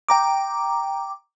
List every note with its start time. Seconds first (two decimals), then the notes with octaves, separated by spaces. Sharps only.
0.09 G5 A#5 D6